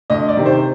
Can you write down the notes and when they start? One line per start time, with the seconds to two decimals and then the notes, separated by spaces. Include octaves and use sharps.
0.10 D2 D#5
0.28 D5
0.37 C3 D#3
0.46 C5